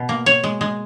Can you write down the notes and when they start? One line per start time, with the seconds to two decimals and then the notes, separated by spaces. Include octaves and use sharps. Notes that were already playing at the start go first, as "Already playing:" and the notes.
Already playing: B2
0.09 A#3
0.26 C#5
0.44 G#3
0.61 G#3